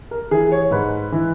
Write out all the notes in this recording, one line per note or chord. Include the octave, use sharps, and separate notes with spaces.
A#4
E3 G#4
C#5
G#2 B4
E3